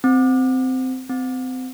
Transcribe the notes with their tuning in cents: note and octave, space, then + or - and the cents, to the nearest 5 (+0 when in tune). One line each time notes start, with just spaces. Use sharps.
C4 -15
C4 -30